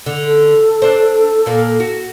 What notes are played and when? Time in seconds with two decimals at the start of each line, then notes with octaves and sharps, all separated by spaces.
0.06 D3
0.26 A4
0.82 D4 C5
1.46 A#2 A#3
1.80 F#4